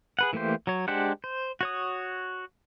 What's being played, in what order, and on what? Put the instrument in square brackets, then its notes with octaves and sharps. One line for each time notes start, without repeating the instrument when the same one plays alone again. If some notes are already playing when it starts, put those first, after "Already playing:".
[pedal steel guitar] G#4 B4 F#5
E3 A3 A#3 G4 C5
F#3 C#5
G#3 D4 G4 C5 F#5
C5
F#4 C#5 D#6